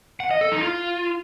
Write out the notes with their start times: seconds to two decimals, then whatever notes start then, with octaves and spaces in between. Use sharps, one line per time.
0.20 F#5
0.31 D#5
0.41 A4
0.52 D#4
0.62 F4